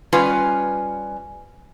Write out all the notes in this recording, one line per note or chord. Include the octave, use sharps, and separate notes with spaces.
G3 C#4 F4 B4 G#5